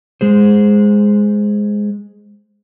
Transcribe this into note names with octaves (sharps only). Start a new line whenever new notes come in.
G#3 G#4 C5